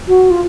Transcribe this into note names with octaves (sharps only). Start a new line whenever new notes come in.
F#4
F4